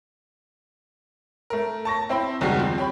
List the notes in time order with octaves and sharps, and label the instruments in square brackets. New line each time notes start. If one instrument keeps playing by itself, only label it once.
[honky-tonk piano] A3 A#4
A5 C#6 A#6
C4 E4 C5 G5 B5
F#1 D#2 G3 G#3 F#4 C7
F3 C4
G4 C#5 B5